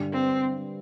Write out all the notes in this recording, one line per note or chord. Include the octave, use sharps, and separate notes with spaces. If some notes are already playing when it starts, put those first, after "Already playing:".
Already playing: G2 D3 G3
C4